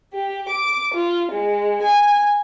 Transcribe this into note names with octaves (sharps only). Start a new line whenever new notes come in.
G4
D6
F4
G#3
G#5